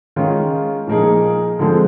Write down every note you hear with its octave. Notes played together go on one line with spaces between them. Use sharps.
D#3 G#3 C#4 F4
A#2 F3 A#3 D#4 G#4
D3 F3 G#3 C4